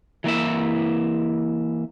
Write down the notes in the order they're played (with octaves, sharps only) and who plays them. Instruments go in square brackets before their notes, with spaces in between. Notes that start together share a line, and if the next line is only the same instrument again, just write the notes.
[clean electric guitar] E3 A#3 E4 E5